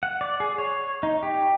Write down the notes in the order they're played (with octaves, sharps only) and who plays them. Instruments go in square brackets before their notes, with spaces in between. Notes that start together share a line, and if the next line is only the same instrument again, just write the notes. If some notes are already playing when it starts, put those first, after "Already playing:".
[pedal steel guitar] F#5
D5
G#4
C#5
D#4
G4